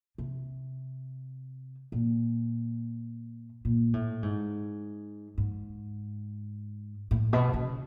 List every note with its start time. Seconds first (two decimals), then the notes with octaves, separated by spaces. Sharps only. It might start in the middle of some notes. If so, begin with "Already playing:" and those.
0.18 C3
1.92 A#2
3.65 A#2
3.94 A2
4.23 G#2
5.38 G#2
7.11 A2
7.33 B2
7.54 C#3